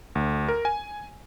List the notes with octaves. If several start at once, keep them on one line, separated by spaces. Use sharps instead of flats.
D2
A#4
G#5